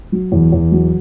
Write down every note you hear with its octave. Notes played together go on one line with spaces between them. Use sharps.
F#3
E2
E2
F#3